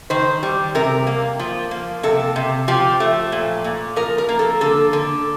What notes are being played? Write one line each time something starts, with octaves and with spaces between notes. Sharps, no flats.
D#3 C5
G3
C3 A#4
A#3
F3
A#3
C3 A4
C3
F3 G4
A3
A#2
A#2
F3 A#4
A#4
A#3
A4
D3 A4
D3